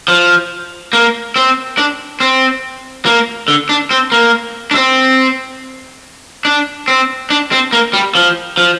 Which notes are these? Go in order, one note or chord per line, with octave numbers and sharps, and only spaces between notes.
F3
A#3
C4
D4
C4
A#3
D3
D4
C4
A#3
D4
C4
D4
C4
D4
C4
A#3
G3
F3
F3